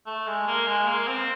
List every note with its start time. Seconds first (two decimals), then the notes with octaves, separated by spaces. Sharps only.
0.06 A3
0.27 G#3
0.47 A#3
0.67 G#3
0.87 A#3
1.08 C4